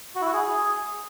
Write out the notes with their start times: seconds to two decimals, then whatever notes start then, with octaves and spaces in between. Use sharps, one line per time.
0.15 F#4
0.21 E4
0.27 F#4
0.33 G#4